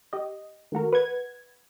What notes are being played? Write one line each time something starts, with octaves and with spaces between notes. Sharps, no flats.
G4 D#5
D#3 A3 F#4 A#4
B4 F#5 G#6